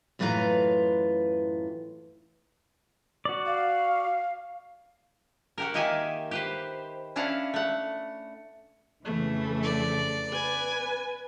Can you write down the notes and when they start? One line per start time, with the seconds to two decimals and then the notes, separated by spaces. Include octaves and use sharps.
0.19 F#2 A2 E3 F4 B4 A#5
3.25 F#4 D5
3.46 F5
5.58 F#4 G4 A#4
5.74 D#3 A#3 G4 D#5 E5 G#5
6.31 G4 B4 C5
7.16 C#4 D4 E4 F5 F#5
7.54 A3 F#5
9.05 F2 C#3 E3 A3
9.63 D5
10.32 B4 G#5